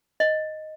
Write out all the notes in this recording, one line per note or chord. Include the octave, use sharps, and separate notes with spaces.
D#5